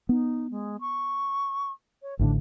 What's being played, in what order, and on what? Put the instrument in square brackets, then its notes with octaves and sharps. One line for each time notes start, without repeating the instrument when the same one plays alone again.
[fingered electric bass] B3 [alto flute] D#4
[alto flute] G#3
C#6
C#5
[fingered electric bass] A1 A2 D3 [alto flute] D4